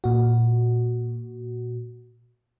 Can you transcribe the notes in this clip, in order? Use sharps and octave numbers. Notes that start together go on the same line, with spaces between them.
A#2 F#4